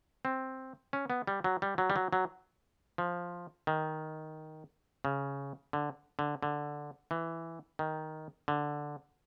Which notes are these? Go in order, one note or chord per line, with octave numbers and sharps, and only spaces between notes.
C4
C#4
B3
G3
F#3
G3
F#3
G3
F#3
F#3
F3
D#3
C#3
D3
D3
D3
E3
D#3
D3